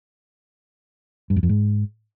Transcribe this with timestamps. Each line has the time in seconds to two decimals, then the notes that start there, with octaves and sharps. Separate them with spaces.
1.30 G2
1.36 F#2
1.43 F2
1.49 G#2